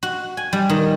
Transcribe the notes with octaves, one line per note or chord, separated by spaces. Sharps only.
F#4
G#5
G3
D#3